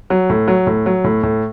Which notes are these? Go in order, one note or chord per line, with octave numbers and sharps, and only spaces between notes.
F#3
A2
F#3
A2
F#3
A2
A2